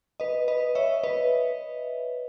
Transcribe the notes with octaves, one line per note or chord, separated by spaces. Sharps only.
B4 D#5
B4 D#5
C#5 E5
B4 D#5